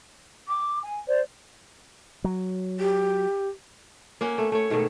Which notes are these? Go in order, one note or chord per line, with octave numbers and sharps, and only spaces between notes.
D6
G#5
C5 D5
F#3
G4
A#3 C#4 F#4
A3
A3 C#5
G#2 B2 D#3 A3